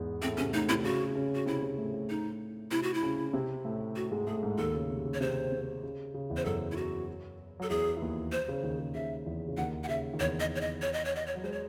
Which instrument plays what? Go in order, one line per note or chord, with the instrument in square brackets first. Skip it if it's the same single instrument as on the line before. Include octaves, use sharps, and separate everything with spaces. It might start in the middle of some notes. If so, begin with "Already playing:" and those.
Already playing: [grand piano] E2 G#2 E3 G#3
[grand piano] A2 A3 [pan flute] C4
[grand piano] C3 C4 [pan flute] C#4
[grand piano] A2 A3 [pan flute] D#4
[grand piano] C3 C4 [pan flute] E4
[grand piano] C#3 C#4 [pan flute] F#4
[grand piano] C#3 C#4
[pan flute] F#4
[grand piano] C3 C4 [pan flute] E4
[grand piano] C3 C4
A2 A3
A2 A3
[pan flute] D#4
[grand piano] C3 C4 [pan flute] E4
[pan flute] F#4
E4
[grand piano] C#3 C#4
C3 C4
A2 A3
[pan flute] F#4
[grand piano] G#2 G#3
[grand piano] A2 A3 [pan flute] G#4
[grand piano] G#2 G#3
[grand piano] D#2 D#3 [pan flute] A4
[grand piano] C#3
C3
C#3
[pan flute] C#5
[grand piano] C3 [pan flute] C5
[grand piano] C3
C#3
C#3
E2 E3
[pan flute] C5
[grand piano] F#2 F#3 [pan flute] A4
[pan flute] E4
F#4
[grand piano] F#3 [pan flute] A4
[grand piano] E2 E3 [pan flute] G#4
[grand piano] E3
D#2 D#3
[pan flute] C5
[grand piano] C#3
D#2 D#3
C#3
[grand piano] C#3 [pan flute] E5
[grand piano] E2 E3
C#3
[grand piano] D#2 D#3 [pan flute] F#5
[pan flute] F#5
[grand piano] C#3 [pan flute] E5
[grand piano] D#3
[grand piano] E2 E3 [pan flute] C#5
[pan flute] D#5
C#5
D#5
C#5
D#5
C#5
D#5
C#5
[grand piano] F#3
[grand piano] G#3 [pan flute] C5
[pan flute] C#5